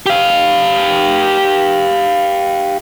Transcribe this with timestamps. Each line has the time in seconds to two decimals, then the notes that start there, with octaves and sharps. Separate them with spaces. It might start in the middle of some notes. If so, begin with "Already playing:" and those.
0.06 G4 F5